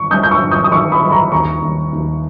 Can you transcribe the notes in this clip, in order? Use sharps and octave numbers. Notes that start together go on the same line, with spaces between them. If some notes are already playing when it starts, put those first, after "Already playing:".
Already playing: G1 D#3 C#6
G2 D#6 G6
G6
C#6 E6
G1
D#6 G6
D#6
D#3 C#6 E6
B5 D#6
G1
B5
A#5 C#6
D#2 A#5 C#6
D#2
D#2